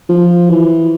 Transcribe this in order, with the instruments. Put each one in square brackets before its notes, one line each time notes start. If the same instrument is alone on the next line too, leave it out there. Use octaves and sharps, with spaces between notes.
[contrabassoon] F3
E3